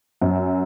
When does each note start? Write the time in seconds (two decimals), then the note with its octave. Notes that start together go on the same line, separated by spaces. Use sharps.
0.22 F#2